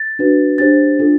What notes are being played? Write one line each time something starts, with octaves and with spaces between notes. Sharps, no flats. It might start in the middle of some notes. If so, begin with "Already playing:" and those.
Already playing: A6
D4 F#4 B4
D4 G4 C5 A6
D4 F4 A4